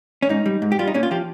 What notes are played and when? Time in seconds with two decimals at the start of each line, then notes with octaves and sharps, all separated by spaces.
0.22 C#4
0.29 G#2 D#4
0.46 G3
0.62 G#2
0.72 G4
0.79 G3 F4
0.87 D#4
0.94 A#2 C#4
1.03 F4
1.11 F3 G4